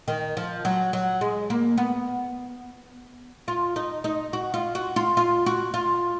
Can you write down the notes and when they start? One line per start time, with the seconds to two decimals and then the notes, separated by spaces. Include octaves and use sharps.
0.08 D#3
0.37 F3
0.65 F#3
0.93 F#3
1.21 G#3
1.50 A#3
1.78 B3
3.48 F4
3.76 D#4
4.04 D#4
4.33 F#4
4.54 F4
4.75 F#4
4.96 F4
5.17 F4
5.46 F#4
5.74 F4